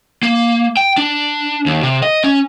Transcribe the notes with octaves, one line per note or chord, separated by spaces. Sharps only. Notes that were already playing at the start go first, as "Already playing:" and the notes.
A#3
G5
D4
D#2
C3
D#5
C#4